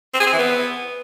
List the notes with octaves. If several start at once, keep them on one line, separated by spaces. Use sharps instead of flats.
C4
G#4
C4
E3
B3